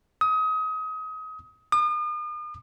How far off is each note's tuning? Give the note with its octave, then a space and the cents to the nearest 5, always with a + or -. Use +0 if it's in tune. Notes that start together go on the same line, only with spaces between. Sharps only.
D#6 +30
D#6 -40